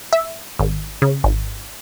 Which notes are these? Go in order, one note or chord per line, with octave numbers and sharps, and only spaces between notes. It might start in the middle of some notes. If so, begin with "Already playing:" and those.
E5
G#1
C#3
G#1